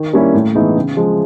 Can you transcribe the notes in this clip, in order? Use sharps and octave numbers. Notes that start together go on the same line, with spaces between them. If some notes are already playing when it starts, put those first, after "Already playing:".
Already playing: D#3
G3 A#3 C#4 E4
A2
E3 G#3 B3 D#4
C#3
F3 G#3